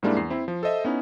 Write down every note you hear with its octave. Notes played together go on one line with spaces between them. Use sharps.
G#2 G3 G#3 A#3 D4 E4
E2 C7
C4 E4
F3
A4 C5 D#5 E5
B3 C#4 D#4 E4